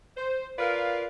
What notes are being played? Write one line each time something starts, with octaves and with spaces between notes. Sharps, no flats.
C5
F4 A#4 B4 D5 F5